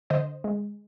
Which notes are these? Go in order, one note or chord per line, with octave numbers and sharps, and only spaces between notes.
D3 C5 D#5
G#3